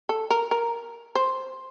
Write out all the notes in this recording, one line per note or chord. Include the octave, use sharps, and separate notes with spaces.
A4
A#4
A#4
C5